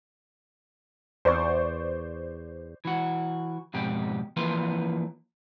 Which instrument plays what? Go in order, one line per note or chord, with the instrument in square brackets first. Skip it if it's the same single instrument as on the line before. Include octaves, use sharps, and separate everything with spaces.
[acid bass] E2 [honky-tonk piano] C5 D5 C#6
[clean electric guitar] E3 F#4
F2 G#2 B2 G4
E3 F3 A#3 E4 B4 C6